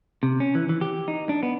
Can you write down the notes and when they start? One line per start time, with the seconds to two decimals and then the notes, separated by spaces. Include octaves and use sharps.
0.23 C3
0.40 C#4
0.55 E3
0.69 E3
0.81 G4
1.08 D#4
1.29 D4
1.43 B3